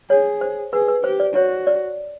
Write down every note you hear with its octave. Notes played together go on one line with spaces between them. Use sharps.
G#4 C#5
C5
G#4 B4
B4
G4 C5
D5
F#4 C#5
D5